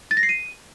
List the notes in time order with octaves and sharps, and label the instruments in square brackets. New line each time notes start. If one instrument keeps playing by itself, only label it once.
[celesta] A6
A#6
C7
D#7